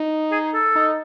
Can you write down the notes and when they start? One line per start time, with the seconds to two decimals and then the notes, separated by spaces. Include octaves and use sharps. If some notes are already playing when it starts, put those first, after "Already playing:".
Already playing: D#4
0.32 G#4
0.54 A4
0.76 D#4